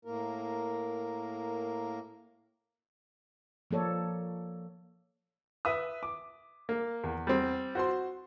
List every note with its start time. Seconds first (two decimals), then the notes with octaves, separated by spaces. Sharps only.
0.05 A2 A#3 A#4
3.71 F3 A#3 A4 C#5 D5
5.65 B4 E5 D#6
6.03 D6
6.69 A#3
7.04 E2
7.27 G3 C4
7.75 F#4 C5 C6